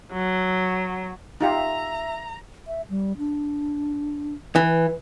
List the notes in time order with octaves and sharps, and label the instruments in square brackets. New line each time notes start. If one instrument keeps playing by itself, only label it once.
[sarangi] F#3
[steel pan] D#4 F4 G4 [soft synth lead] E5 [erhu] A#5
[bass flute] E5
G3
D4
[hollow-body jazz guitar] E3 [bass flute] B4